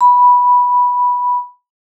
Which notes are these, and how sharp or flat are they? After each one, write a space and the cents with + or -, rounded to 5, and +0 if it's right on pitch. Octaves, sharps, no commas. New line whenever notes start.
B5 -10